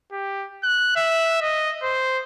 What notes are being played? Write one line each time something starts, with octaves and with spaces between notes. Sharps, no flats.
G4
F#6
E5
D#5
C5